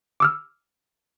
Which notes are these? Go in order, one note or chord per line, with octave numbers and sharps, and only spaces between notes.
D6 E6 F6